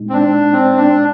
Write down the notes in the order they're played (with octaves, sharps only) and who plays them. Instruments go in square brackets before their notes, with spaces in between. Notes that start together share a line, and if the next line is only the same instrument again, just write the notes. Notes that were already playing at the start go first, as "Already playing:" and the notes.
Already playing: [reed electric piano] A#2 G#3 D#4
[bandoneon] C4
D4
C4
D4